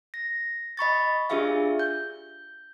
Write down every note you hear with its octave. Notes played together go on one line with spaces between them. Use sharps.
A#6
D#5 B5 C#6 A6
D4 F4 G4 G#4 E5 F5
G6